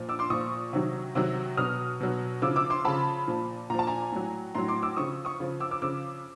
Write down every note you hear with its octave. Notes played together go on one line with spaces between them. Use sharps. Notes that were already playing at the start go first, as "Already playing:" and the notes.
Already playing: A#2 F3
D6 E6
C6 D6
A#2 F3 C#6 D#6
C3 D#3 F#3
C3 D#3 F#3
B2 F#3 D#6 F6
B2 F#3
C#3 F3 D6 E6
D6 E6
C6 D6
C#3 F3 A5 B5
A#2 F3
A#2 F3 A#5
A5
G#5 A#5
A2 F#3
A2 F#3 A#5 C6
C6 D6
D6 E6
C#3 F3 C#6 D#6
C#6 D#6
C#3 F3
D6 E6
D6 E6
C#3 F3 D6 E6